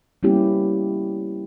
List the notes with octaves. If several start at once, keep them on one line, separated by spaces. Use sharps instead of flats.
G3 A#3 B3 C#4 E4 G4